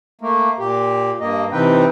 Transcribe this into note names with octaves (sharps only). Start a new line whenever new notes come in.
A3 A#3
A#2 G4
G2 A#3 D#5
C3 E3 C4 D#4 B4 G5